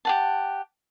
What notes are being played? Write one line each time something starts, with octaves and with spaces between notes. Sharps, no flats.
G4 F#5 A5